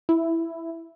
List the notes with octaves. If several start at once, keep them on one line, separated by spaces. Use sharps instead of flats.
E4